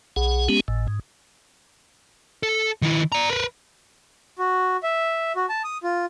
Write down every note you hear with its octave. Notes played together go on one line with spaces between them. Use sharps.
B1 G#4 F#5
G#3 B3 C#4 G4
G#1 A2
G#2
A4
D#3 E4
D5 A#5
A#4 B4
F#4
E5
F#4
A5
D#6
F4